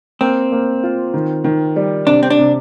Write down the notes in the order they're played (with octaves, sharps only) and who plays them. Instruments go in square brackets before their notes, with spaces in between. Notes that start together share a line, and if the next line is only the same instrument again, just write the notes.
[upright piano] A#3 [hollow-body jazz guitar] C4
[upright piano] A#3
F4
D#3
D#3
G3
[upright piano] C3 [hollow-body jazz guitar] D4
[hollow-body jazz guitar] C4
D4
[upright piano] C3